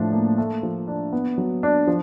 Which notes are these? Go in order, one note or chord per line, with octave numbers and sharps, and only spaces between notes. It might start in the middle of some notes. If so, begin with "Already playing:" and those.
Already playing: A2 F3 D4
A#3
A3
F3
D4
B3
F#3
D4
F3